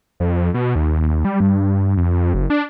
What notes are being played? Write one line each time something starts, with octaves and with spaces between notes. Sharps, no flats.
F2
B2
D#2
G3
G2
F2
F#1
D4